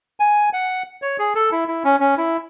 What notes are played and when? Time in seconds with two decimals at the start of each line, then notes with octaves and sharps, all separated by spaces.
0.20 G#5
0.53 F#5
1.02 C#5
1.19 G#4
1.35 A4
1.52 E4
1.68 E4
1.84 C#4
2.00 C#4
2.17 E4